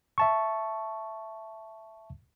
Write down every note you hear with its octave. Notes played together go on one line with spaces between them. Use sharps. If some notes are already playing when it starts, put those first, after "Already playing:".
E5 A5 C#6